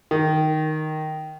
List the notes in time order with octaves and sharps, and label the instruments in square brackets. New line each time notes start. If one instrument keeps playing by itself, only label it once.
[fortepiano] D#3